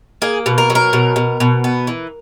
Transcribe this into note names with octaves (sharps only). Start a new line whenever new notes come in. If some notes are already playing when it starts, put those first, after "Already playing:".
A#3 G#4
B2
A#4
F#3
A#4
B2
B2
B2
B3
E3